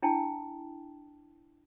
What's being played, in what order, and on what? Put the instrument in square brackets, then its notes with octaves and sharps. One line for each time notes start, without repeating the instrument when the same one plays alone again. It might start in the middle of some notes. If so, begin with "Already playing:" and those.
[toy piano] D4 E4 G5 A5